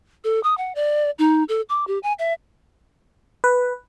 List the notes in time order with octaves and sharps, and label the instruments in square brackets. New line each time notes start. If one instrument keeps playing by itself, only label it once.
[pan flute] A4
D#6
F#5
D5
D#4
A4
D6
G4
G#5
E5
[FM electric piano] B4